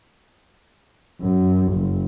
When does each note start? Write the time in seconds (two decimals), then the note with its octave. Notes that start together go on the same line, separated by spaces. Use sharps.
1.21 F#2
1.73 F#1